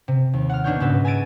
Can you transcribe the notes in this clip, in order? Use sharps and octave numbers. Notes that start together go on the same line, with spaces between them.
C3
D#2
F#5 F6
B2 A#3 D4 D#4 C#5 G6
C#2 G#2 F#4 B4 E6
G#5 A#5 E6 A6 D7 D#7